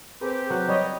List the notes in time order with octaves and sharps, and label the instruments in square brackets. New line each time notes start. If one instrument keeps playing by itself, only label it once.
[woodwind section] C4 G4 [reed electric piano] G#4 A#4 B4
[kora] F#3 [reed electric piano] B4 C#6 F#6
[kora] G3 [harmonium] C#5 D#5